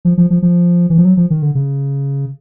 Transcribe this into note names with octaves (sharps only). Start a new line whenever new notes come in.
F3
F3
F3
F3
E3
F3
F#3
F3
D#3
D3
C#3